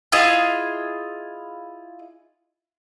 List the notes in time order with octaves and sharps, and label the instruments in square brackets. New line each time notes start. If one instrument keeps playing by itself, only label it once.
[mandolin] E4 F4 G#4 D#5